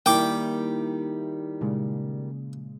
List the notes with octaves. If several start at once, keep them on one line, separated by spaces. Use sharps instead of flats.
D#3 G3 A#3 E4 G5 D6
A#2 C#3 G#3